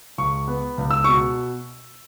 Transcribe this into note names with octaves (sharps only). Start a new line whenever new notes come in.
C#2 C#6
B3
C#2
E6
B2 C#6